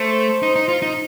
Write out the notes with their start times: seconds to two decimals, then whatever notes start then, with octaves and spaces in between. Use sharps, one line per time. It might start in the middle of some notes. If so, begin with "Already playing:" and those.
Already playing: A3 C5
0.43 D#4
0.56 D#4
0.68 F4
0.82 D#4